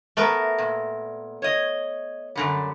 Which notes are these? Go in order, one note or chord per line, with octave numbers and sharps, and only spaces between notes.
A3 B3 A#4
A#2
C#5 D#5
F#2 D3 G3